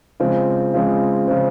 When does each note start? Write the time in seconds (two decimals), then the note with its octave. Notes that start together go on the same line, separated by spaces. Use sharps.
0.20 C#3 F3 G#3 C4
0.74 C#3 F3 G#3 C4
1.28 C#3 F3 G#3 C4